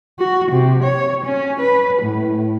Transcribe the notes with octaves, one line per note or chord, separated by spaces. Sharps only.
F#4
C3
C#5
C#4
B4
A2